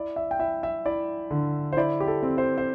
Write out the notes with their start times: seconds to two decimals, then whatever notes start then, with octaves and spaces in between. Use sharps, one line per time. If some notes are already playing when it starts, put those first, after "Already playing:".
Already playing: E4 D5
0.16 E5
0.31 G5
0.39 E4 E5
0.63 E5
0.85 E4 D5
1.31 D3
1.73 C5
1.77 E4 D5
2.00 G4
2.08 A4
2.23 C4
2.38 C5
2.58 C5